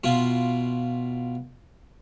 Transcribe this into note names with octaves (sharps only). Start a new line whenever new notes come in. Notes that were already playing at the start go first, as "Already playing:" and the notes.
B2 E4 F4